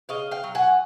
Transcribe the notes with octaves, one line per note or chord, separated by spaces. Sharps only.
C#3 D#5 F5
F5 G5
F#3
F#5 G#5